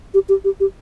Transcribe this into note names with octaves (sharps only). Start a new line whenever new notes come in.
G4
G4
G4
G4